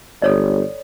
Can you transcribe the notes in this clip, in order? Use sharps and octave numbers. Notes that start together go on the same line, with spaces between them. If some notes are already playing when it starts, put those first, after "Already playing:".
G1 A4 C#5 D5